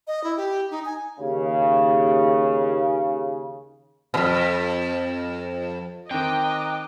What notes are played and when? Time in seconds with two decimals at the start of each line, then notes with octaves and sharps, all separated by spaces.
0.07 D#5
0.24 E4
0.37 G4
0.71 D#4
0.85 G#5
1.20 D#2 C#3
4.14 F2 B2
6.11 D#3 C4 D#5 G5 A#5 D6 F#6